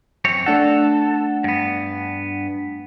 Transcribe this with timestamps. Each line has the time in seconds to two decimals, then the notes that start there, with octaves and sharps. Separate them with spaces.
0.25 F#2 C4 C#5
0.46 A3 D4 A4 F#5
1.44 G2 B3